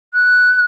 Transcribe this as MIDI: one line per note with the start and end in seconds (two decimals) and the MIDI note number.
0.13 0.63 90